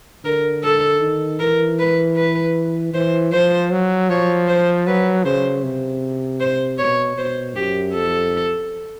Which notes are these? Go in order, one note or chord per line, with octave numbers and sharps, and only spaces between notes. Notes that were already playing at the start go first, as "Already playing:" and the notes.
D3 A#4
A4
D#3
E3 A#4
B4
B4
E3 C5
F3 C5
F#3
F3 C#5
C5
F#3 B4
C#3 C5
C3
C5
B2 C#5
B2 C5
F#2 G4
F2 A4